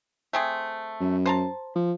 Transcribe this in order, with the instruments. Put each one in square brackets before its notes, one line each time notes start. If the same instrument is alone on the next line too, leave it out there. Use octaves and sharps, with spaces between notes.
[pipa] A3 C4 G#4
[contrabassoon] F#2
[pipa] C5 A5 A#5
[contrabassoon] F3